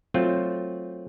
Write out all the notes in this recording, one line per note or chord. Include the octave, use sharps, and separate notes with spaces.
F#3 A3 C4 F4